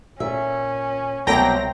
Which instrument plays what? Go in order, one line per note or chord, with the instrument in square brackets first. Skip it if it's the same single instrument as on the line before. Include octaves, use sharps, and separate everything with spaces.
[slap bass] A#2 [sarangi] C#4 [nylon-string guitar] E5
[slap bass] C2 [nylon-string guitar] B2 F#3 A#3 [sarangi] C4 [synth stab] G5 A#5 A#6